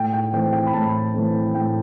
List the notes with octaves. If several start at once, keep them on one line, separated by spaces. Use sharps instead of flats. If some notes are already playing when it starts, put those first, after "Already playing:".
Already playing: A2 G5
G5
E3 A3 C4 G5
G5
B5
A2 A5
E3 A3 C4
A2 G5